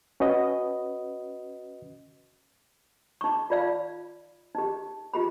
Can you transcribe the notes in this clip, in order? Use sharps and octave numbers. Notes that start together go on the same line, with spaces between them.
C#4 F#4 B4 D#5
D#4 C#6
F4 D5 F5 B5
D#4 G4
F4 G4 B5